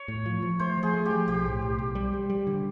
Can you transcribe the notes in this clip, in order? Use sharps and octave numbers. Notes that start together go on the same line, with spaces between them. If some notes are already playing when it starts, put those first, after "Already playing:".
Already playing: C#5
A2
F3
F3
A3 C5
F3
G#4
A3
G4
F3
B1 G4
A2
B1
B1
G3
G3
G3
D3